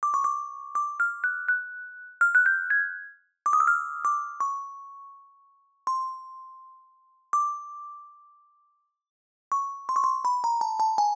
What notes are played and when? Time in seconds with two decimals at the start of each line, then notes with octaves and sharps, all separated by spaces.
0.03 D6
0.14 C#6
0.24 D6
0.75 D6
1.00 F6
1.24 F#6
1.48 F#6
2.21 F6
2.35 F#6
2.46 G6
2.70 G#6
3.46 D6
3.53 D#6
3.60 E6
3.67 F6
4.05 D6
4.40 C#6
5.87 C6
7.33 D6
9.52 C#6
9.89 C6
9.96 C#6
10.04 C6
10.25 B5
10.44 A#5
10.61 A5
10.80 A5
10.98 G#5